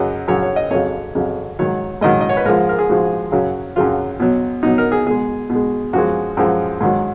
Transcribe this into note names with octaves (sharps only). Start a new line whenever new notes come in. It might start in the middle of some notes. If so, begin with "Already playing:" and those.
Already playing: F#2 C#3 F#3 D#5
F#2 C#3 F#3 C#5
C#5
D#5
F2 C#3 F#3 C#5
F2 C#3 F#3
G#2 D#3 F#3 C#5
G#2 D#3 F#3 D#5
D#5
C#5
B4
G#2 F3 G#3 A#4
A#4
G#4
G#2 F3 G#3 F#4
F#2 C#3 F#3
F#2 C#3 F#3 F4
B2 F#3
B2 F#3 D#4
A#4
G#4
B2 G#3 G#4
B2
G#3
F#2 F3 G#3 F#4
F#2 F3 G#3
G#2 D#3 F#3